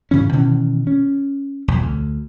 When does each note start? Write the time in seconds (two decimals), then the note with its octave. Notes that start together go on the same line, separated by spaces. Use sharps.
0.11 G#2 C#3 E3 C#4
0.33 B2 D#3 E3 C#4
0.87 C#4
1.68 B1 F2
1.82 D2